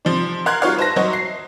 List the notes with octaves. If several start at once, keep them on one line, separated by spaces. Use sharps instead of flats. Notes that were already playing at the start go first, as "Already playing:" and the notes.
C3 F3 D4
A#4 F5 A#5 C6 F#6 G#6
G3 F4 F#4 C#5 F5
B4 C5 E5 A5 A#6
F#3 F#4 C5 C#5 D#5 E5
C7